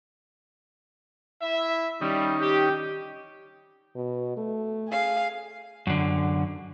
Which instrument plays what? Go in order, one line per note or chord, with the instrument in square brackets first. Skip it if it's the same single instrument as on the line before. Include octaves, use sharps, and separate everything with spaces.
[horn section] E4 E5
[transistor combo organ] D#3 C#4 D#4 [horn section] G3
[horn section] G4
[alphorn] B2
A3
[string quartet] G#4 F5
[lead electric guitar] F#2 D3